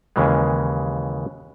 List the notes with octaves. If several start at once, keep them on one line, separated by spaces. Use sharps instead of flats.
D#2 C#3 E3 G#3